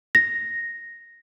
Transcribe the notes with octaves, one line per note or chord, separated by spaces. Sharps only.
A#6